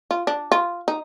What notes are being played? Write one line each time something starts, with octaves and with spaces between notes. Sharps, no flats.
F4
D4
F4
D#4